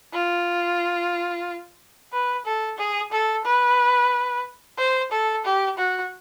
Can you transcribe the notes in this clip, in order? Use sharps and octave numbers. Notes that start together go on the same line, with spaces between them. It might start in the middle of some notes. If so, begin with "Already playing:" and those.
F4
B4
A4
G#4
A4
B4
C5
A4
G4
F#4